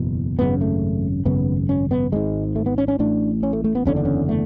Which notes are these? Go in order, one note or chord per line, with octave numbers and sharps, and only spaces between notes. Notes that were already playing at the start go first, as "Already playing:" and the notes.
Already playing: F#1 E2 B2
G#1 F#2 C#3 B3
A3
G#1 F#2 C#3 B3
C#4
B3
G#1 G#2 G#3
A3
B3
C#4
C#4
A1 A2 D4
C#4
A3
A3
B3
F#1 E2 D3 C#4
D4
C#4
A3